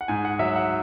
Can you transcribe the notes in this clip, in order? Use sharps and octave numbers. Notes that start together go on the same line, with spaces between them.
F#5
G#2 G#5
F#5
F#3 E5
F#5